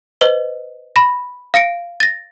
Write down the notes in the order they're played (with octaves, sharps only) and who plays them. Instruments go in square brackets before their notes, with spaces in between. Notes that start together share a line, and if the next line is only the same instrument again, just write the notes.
[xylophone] B4 C5 D#5 G7
B5 A#6
F5 A#6 C#7 D7
A6 A#6